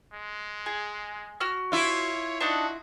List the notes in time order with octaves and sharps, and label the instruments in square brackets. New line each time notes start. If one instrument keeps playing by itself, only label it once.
[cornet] G#3
[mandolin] G#4
F#4 F6
[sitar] E4 F4 [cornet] C#5
[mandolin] D4 D#4 F#6 [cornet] F#4